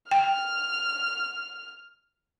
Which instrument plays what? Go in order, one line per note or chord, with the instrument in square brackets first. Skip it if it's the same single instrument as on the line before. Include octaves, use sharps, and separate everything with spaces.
[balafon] G5 [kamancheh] F6